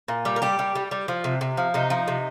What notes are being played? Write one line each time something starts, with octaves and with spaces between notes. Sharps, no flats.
A#2
G3
A#4
G3 G4
G3
G3
G3
F3
C3
C3
F3
C3 D#4
F3
C3